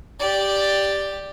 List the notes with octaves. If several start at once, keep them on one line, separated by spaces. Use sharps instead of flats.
G4 D5